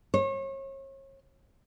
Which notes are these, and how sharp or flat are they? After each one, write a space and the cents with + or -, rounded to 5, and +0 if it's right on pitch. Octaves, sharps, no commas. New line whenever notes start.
C#5 -35